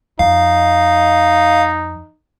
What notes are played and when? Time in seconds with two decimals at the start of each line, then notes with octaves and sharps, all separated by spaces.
0.19 F2 D#4 F5